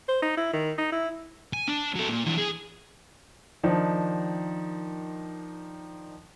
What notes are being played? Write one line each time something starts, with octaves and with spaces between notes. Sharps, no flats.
C5
D#4
E4
D#3
D#4
E4
G#5
D4
F#3 A4
A#2
E3 D4
G#4
D#3 F3 D4 D#4